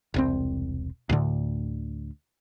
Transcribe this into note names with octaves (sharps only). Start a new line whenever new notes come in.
E1 C2 C4
D2 A2 D3